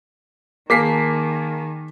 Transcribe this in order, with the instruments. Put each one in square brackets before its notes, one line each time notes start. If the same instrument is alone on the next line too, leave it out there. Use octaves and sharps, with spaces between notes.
[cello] D#3 [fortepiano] A#3 [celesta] G#4 G#5 A5 [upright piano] D6 B6 C7